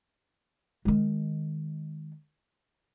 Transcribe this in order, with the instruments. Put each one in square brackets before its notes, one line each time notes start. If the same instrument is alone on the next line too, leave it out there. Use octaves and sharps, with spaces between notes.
[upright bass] D#3 G#3